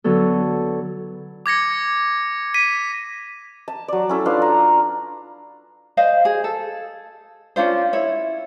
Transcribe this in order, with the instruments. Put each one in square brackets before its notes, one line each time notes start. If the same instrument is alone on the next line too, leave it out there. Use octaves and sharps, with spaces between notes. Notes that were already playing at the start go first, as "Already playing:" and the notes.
[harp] D3 F#3 B3 A4
[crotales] D6 G#6 A#6 C#7
B6 D#7
[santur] A5
F#3 D5
C#4 E4 A4
D4 F4 B4 F5
A#5
[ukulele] C5 D#5 F5
G#4
A4
C#4 D4 F4 C5
E4 C#5